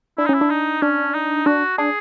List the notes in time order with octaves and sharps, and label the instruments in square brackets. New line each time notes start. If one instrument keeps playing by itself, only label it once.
[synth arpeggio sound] D4 [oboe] E4
[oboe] D#4
[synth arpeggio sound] C#4 [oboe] E4
[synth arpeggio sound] D4
[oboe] D#4
[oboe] C#4 [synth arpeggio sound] D4
[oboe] D#4
[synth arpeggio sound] D4 [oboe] F#4
[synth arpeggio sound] D4 [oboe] G#4